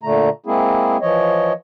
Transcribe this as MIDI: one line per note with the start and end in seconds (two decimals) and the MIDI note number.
0.03 0.29 46
0.03 0.29 50
0.03 0.29 57
0.03 0.29 82
0.46 0.97 56
0.46 0.97 58
0.46 0.97 60
0.46 0.97 64
0.46 0.97 68
1.02 1.53 52
1.02 1.53 53
1.02 1.53 73
1.02 1.53 75